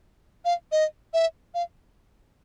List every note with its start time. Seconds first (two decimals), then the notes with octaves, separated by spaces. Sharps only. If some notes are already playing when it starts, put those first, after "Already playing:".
0.45 F5
0.72 D#5
1.14 E5
1.54 F5